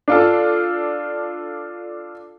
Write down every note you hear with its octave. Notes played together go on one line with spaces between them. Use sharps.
D4 F4 A4